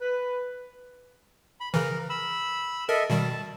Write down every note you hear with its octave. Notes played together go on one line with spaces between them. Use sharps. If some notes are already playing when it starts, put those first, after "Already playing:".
B4
B5
C#3 E3 A#4
B5 E6
A4 A#4 D#5 E5
B2 D#3 G3 A5